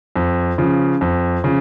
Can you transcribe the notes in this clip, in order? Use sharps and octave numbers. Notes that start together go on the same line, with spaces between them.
F2
C#3 F3
F2
C#3 F3